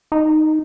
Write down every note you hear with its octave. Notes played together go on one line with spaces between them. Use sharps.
D#4